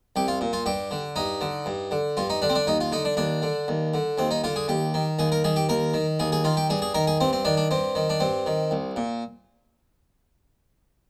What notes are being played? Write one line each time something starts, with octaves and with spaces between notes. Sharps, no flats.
C2 G4
F4
A#2
F4
G2 G4
D3
G2 D#4
D3
G2
D3
G2 F4
D#4
D3 D4
C4
D4
D#2 D#4
F4
D3 D#4
D4
D#2 D4
D3
D#2
D3
D#2 C4
D#4
D3 F4
G#4
D#2 G4
D#3
D#2 G#4
A#4
D#3 G#4
G4
D#2 A#4
D#3
D#2 G#4
G#4
D#3 F4
G4
G2 G#4
G#4
D#3 A#4
G#4
G2 C4
C4
D#3 D4
D4
G2 C4
D#3
D4
G2 C4
D#3
C2
A#2